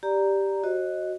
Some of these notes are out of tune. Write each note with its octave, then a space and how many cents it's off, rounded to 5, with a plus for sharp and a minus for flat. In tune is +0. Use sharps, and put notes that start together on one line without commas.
G4 +0 D5 -5 A#5 +0
F#4 +0 C5 +45 D#5 +0